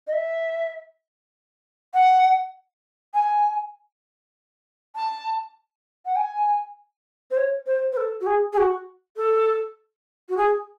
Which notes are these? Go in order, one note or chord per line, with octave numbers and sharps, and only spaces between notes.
D#5
E5
F#5
G#5
A5
F#5
G#5
C5
C#5
C5
C5
A4
F#4
G#4
G#4
F#4
A4
F#4
G#4